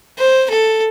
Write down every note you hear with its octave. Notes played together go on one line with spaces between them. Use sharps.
C5
A4